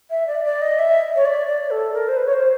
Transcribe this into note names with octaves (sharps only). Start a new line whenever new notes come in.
E5
D5
D5
D#5
E5
C#5
D5
D5
A4
A#4
C5
B4
C#5
C5